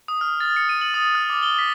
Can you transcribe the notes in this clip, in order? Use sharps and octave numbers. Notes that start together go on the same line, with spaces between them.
D#6
F6
A6
C#7
D#7
F#7
D#6
F6
D6
G7
B6